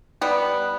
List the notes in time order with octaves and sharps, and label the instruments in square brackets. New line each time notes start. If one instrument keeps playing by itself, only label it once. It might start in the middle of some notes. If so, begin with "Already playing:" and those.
[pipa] G3 B3